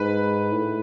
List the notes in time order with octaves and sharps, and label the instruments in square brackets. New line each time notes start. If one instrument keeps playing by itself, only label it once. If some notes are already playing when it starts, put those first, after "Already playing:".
Already playing: [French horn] G#2 [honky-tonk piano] B4
[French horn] A2